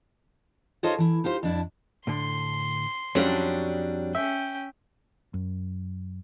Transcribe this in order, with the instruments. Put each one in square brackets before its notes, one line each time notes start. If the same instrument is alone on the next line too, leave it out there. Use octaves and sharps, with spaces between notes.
[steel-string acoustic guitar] D#4 F4 A4 C5 C#5 D#5
E3 E4
D#4 F4 G4 C5
F2 D4 E4
[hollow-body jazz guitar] A2 D3 [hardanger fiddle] C6
[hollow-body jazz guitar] F2 [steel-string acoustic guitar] F#3 G3 D4 [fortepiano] C#4
[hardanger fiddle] C#4 G5 [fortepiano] E5
[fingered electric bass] F#2